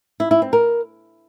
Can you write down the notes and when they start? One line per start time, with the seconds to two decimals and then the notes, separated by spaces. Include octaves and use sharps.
0.20 E4
0.31 E4
0.42 C4
0.53 A#4